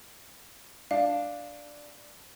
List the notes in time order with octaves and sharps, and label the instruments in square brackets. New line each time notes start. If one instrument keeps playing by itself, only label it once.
[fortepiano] D4 [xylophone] F5